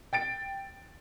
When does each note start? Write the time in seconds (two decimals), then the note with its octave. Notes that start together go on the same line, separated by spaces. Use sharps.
0.13 G5 A6 D7